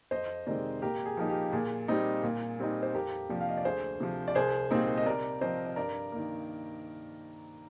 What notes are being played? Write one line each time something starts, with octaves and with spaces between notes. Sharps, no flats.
F2 C5 D#5
C3 D#3 G#3 C4 A#4 D5
A#2 G4 A#4
G#4
F3 A#3 D#4
G4
A#2 G#4
G3 C4 D#4
A#2
G3 C4 D#4
C5
F2 G4 A#4
C3 F3 A#3 D4
F5
D#5
D5
D2 G#4 C5
C3 F3
D5
C2 G#4 C5
A#2 G3 C4 D#4
D#5
C3 A#4 D5
F3 C4 C5 D#5
D#5
G2 A#4 D5
D#3 A#3